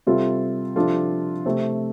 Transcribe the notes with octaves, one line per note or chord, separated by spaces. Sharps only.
C3 G3 C4 F4 A4
C3 F3 D4 F4 A4
C3 A3 C4